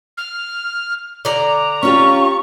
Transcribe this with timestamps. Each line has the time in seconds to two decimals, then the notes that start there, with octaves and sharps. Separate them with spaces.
0.17 F6
1.25 D3 D5 A#5
1.83 C#4 F4 G4 C#6